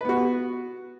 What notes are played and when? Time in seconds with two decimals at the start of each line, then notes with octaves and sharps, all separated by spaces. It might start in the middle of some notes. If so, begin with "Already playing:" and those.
0.01 B4
0.05 B3
0.09 F#4